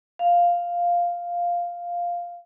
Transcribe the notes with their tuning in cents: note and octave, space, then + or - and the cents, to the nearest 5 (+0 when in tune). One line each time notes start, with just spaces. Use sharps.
F5 +0